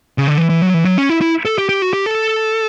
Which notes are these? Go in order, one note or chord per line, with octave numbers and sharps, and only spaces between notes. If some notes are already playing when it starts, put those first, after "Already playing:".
C#3
D3
E3
E3
F#3
E3
F#3
C#4
E4
E4
A4
G4
G4
F#4
G4
A4